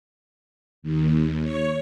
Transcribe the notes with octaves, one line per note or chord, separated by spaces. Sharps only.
D#2
C#5